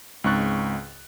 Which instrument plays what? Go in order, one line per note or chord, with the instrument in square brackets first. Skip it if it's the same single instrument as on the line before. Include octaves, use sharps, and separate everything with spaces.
[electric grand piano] C#2 G#2 C4 C#6 F#6 A6